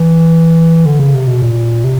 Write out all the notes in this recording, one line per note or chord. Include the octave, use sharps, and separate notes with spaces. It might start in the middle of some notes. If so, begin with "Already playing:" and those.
Already playing: E3
D3
C#3
C3
B2
A#2
C3